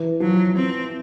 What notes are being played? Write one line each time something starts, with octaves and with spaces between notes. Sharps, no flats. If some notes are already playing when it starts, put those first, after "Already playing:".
Already playing: E3
F3 F#3
C4